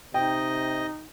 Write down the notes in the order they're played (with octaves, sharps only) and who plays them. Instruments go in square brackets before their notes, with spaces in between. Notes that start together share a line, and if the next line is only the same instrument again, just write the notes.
[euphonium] C3 [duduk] D#4 [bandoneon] D#5 [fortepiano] G5